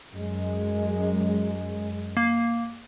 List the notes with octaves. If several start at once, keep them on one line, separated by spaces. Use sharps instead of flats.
F#2 G#3
A#3